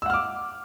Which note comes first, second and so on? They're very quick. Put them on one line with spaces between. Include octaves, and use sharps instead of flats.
E6 F#5 F6 D6